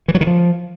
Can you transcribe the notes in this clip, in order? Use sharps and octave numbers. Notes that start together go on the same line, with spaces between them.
E3
F#3
D#3
F3